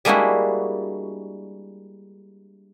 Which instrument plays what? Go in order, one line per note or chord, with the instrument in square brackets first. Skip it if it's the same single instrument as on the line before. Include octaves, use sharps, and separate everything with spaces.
[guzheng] G3 G#3 A#3 D4 E4 F#4